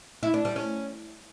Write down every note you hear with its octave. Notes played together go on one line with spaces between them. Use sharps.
E4
D4
G3
C#4